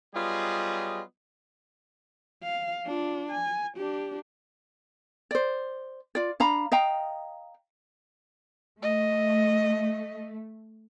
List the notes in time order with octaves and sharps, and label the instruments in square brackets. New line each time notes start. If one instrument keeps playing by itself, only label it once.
[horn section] F#3 G3 B3 F4 G#4 D#5
[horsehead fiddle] F5
D4 F4
G#5
D4 G4
[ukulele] C5 D5
F4 D5
D4 F5 A#5 B5
D#5 F5 G5 A#5
[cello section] A3 [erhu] D#5